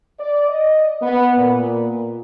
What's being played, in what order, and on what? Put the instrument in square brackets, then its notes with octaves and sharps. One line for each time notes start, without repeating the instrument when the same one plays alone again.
[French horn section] D5
D#5
B3
A#2